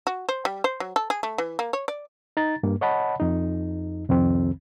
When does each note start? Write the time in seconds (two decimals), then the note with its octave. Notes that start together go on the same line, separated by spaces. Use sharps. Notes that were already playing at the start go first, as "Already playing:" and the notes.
0.07 F#4
0.29 C5
0.45 G3
0.64 C5
0.80 F#3
0.96 A4
1.10 G#4
1.23 A3
1.38 E3
1.59 A#3
1.73 C#5
1.88 D5
2.37 D#4 A#5 A6
2.63 G2 A#3
2.81 C#5 D#5 F#5 A5 B5
3.20 F2 D#4
4.09 C2 F2 D#3 C4